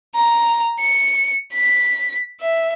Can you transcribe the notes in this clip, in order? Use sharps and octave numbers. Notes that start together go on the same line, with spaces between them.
A#5
C#7
B6
E5